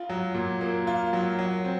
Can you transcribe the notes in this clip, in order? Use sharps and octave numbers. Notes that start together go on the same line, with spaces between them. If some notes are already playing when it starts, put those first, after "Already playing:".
Already playing: F4
F#3
A#2
A#3
F4
F#3
F#3
C4